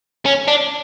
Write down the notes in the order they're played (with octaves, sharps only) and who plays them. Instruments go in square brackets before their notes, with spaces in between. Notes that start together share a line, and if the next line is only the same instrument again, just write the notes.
[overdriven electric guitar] C#4
D4